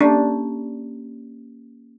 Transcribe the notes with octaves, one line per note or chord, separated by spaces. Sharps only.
A#3 C#4 D4 G4